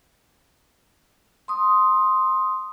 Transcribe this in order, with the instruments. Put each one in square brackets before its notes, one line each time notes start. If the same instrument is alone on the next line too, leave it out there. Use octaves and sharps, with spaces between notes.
[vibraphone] C6 D#6